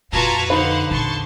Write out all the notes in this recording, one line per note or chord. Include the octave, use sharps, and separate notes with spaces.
F2 A#2 F4 F#4 B4 A5 A#5 G#6
D3 D#4 B4 C5 F5 F#5
A#1 E2 A5 C6 C#6